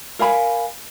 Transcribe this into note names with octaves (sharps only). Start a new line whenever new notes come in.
A#4 F5 G#5 B5